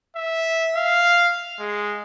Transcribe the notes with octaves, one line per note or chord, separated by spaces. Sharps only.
E5
F5
G#3